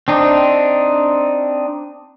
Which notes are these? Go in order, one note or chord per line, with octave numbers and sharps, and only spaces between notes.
C4 D4 D#4